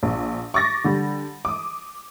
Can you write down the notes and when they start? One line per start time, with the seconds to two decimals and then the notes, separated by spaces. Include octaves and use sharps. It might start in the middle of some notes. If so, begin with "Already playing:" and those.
0.03 A#1
0.54 C#6 D6 A6 A#6
0.84 D3 G3
1.45 D6 D#6